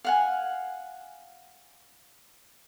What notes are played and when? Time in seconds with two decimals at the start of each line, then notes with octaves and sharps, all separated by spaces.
0.05 F5 F#5 G#5